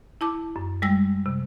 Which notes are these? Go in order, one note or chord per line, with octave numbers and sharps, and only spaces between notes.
E4 A5 D6
F#2
G3 G#3 G5 E6 A#6
C3